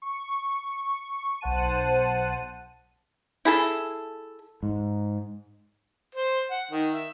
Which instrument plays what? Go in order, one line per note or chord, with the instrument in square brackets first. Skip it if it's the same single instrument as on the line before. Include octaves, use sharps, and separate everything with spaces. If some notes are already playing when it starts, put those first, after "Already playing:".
[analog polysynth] C#6
B1 C5 F#5 A5 D#7
[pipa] E4 G#4 A4
[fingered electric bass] G#2
[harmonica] C5
F#5
D#3
E5